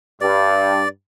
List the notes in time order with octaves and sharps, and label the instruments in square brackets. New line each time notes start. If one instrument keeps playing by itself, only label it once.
[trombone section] G2 [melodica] D5